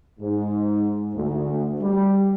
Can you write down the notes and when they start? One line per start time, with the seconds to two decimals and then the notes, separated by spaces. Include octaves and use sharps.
0.20 G#2
1.15 D2
1.81 G3